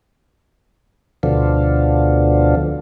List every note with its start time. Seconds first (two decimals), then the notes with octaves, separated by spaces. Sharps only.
1.23 D2 B2 D3 F3